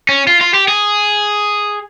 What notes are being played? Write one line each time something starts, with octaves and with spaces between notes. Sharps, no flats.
C#4
F4
F4
G4
G#4